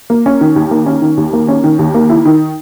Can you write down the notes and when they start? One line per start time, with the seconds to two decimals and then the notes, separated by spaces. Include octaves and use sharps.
0.10 A#3
0.26 C#4
0.41 D#3
0.56 D#2
0.71 A#3
0.86 C#4
1.02 D#3
1.17 D#2
1.33 A#3
1.48 C#4
1.64 D#3
1.79 D#2
1.94 A#3
2.10 E4
2.25 D#3